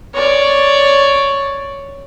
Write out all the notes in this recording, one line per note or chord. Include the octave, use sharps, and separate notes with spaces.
C#5 D5